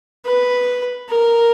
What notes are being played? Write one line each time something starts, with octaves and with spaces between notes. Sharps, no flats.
B4
A#4